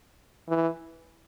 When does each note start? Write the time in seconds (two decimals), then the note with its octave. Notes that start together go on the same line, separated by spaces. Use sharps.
0.48 E3